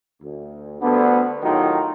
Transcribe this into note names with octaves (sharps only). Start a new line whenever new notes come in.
D2
D2 G2 D3 B3
A2 D#3 F#3 D#4 F4 G4